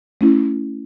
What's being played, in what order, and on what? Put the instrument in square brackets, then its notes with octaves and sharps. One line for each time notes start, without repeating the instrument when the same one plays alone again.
[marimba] A3 C#4 E4